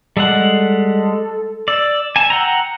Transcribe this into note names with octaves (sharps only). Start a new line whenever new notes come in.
G3 G#3 A4 F#5
D5 E6
G#5 A5
F#5 G5 A#5